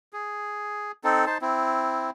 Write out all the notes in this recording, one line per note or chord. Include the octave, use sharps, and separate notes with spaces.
G#4
C4 D#4 A4
D#4 C5 A5
C4 E4